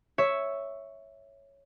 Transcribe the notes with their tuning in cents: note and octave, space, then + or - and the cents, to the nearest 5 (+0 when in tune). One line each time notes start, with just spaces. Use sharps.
C#5 +0 E5 +0